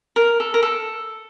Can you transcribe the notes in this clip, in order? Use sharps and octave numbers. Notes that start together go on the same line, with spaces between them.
A#4
A4
A#4
A4